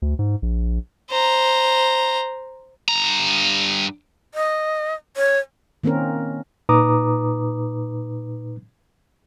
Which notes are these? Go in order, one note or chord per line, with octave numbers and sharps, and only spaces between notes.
D2
G#2
A#1
C5 A#5
G2 A#5
D#5
C#5
D#3 A#3 C4 C#4 A#4
A#2 D#4 B4 A#5 D6 D#6